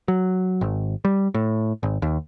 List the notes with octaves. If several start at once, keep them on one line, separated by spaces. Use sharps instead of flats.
F#3
G#1
G3
A2
G#1
D#2